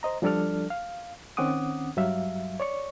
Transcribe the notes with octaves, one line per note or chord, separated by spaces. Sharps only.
C5 D#5 A#5
F3 G3 D4 A4 D5 F6
F5
D#3 C4 C#4 F#5 D6 D#6
G2 F#3 G3 E5 F5
C#5 D5 C#6